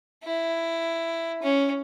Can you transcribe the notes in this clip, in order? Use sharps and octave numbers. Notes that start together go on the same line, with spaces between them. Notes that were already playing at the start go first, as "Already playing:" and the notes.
E4
C#4